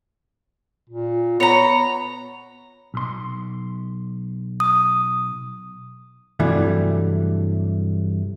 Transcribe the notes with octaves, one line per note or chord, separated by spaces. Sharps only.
A#2
B3 C#5 A#5
B1 C6
D#6
G2 C3 E3 F#3 G3 A3